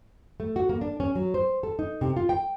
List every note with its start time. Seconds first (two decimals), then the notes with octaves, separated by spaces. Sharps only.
0.40 A3
0.56 F#4
0.69 A#3
0.81 D4
1.00 C#4
1.15 F#3
1.34 C5
1.63 A4
1.79 D#4
2.01 C3
2.16 F4
2.29 G5